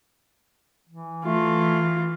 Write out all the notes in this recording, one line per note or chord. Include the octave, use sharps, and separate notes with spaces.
E3
E3 A3 F4